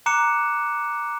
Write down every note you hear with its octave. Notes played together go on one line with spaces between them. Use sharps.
A#5 D6 F#6 C#7 E7